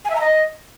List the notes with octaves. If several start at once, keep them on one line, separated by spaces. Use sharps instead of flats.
G#5
E5
A#5
D#5